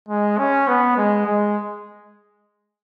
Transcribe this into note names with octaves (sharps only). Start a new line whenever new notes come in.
G#3
C#4
B3
G#3
G#3